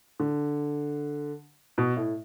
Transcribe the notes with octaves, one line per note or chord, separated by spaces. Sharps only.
D3
B2
A2